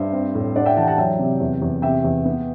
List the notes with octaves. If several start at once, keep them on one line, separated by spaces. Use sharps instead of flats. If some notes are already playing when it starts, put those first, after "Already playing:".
Already playing: G2 C5 E5
C4
A2
D4 D5 F#5
E5 G5
E3 F#5 A5
G5
F#5 A5
F#3 E5 G5
C3
E2
E2
C3 E5 G5
E2
B3